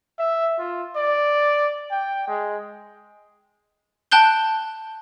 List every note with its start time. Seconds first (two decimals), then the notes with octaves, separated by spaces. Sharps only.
0.19 E5
0.59 F4
0.96 D5
1.91 G5
2.28 G#3
4.12 G5 A5 F#6 G6 G7